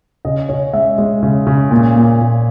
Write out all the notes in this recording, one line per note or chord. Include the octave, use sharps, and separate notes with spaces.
C#3 D#5
C#3 C#5
G#3 E5
G#3
C#3
C#3
A#2
A#2
A#2